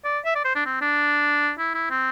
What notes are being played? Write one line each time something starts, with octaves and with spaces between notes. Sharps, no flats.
D5
E5
D5
C5
D4
C4
D4
E4
E4
C4